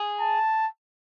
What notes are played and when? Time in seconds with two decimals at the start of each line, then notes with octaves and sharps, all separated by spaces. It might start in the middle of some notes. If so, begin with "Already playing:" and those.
Already playing: G#4
0.20 A5